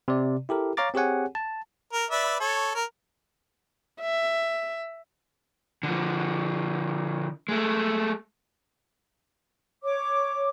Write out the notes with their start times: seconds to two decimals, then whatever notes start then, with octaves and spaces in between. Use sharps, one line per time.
0.08 C3 D5
0.49 E4 G4 A4 A#4
0.77 C#5 F5 A#5 D6 A6
0.94 C4 G4 G#4 C#5 F#5 G#5
1.35 A5
1.93 A#4
2.11 B4 D5 E5
2.40 A4 C#5
2.75 A#4
4.01 E5
5.83 D3 F3
7.49 G#3 A3
9.83 C#5 D6